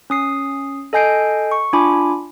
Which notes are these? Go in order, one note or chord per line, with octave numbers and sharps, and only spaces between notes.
C#4 D#6 C7
A4 D#5 G#5 G6 C7 D7
C#6
D4 F4 G#5 B5 D6